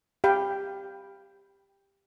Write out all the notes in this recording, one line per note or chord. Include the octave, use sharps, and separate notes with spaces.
G4 F5 G5 B5